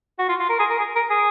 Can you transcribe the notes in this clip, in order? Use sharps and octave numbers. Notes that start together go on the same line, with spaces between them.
F#4
F4
F4
A#4
G#4
A#4
G#4
A#4
G#4